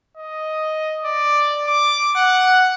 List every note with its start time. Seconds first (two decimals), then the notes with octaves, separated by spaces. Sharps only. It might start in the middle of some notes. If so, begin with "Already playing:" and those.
0.17 D#5
1.05 D5
1.67 D6
2.16 F#5